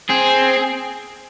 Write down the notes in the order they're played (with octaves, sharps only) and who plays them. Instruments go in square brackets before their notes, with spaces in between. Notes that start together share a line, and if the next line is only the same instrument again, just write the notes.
[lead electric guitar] C4 [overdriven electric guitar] G#4